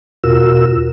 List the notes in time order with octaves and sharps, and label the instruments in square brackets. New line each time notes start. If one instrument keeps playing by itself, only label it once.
[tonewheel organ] E2 B2 F4 F#4 A#4 E6